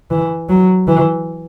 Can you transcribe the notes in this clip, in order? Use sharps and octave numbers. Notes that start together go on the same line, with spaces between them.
E3
F#3
E3